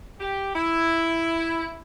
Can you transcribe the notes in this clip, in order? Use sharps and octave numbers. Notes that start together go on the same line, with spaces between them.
G4
E4